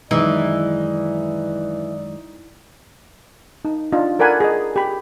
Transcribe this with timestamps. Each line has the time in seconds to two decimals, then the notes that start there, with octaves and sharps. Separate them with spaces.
0.11 F#2 D#3 E3 G#3 D#4 D5
3.65 D#4
3.92 D4 F4 D#5
4.19 A4 A#4 D5 F#5 G#5 B5
4.40 G#4 D#5
4.76 G4 B5